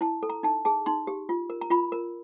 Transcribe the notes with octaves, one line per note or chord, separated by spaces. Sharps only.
E4 A5
A4
A#5
D#4 A5
G#4 A5
D#4 C6
G4
F4
A#4
A#5
F4 B5
A#4